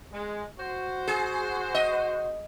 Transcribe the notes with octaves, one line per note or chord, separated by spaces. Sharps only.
G#3
F#4 C5
G#4
D#5